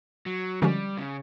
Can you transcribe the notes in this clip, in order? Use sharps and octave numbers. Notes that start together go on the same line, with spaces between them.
F#3
D3 F3 G3 G#3 C#4 F#4
C#3